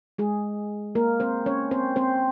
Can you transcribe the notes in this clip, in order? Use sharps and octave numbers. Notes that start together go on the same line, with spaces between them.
G#3 G#4
A#3 A#4
C4 C5
C#4 C#5
C4 C5
C4 C5